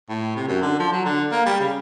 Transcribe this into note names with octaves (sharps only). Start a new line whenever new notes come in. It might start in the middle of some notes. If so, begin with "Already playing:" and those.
A2
C3
F#2
D3
F3
F#3
D3
A#3
G3
C#3